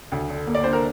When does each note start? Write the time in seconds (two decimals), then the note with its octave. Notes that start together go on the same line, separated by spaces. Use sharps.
0.12 D2
0.30 D3
0.47 A#3
0.55 D5
0.64 D4 C5
0.73 A#4